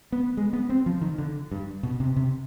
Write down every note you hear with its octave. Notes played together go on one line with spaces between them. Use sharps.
B3
G#3
B3
C4
F3
D#3
D3
G2
B2
C3
C3